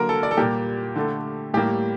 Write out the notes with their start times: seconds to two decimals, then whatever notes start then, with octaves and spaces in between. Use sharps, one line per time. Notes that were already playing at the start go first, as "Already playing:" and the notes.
Already playing: D3 F#3 A#3 A#4
0.09 A4
0.23 D5
0.31 A4
0.37 A#2 G3 A#3 G4
0.96 D3 A3
1.54 A2 G3 A#3 G4